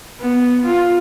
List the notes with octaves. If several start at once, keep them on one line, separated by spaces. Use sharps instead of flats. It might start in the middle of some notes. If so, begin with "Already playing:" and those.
B3
F4